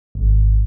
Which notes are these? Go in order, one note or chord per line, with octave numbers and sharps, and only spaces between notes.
G#1